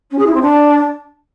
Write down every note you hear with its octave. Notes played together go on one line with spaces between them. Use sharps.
C#4
G#4
E4
C4
D4